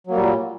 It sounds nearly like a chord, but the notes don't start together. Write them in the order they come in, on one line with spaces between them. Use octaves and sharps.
F#3 A#3 G3 A#2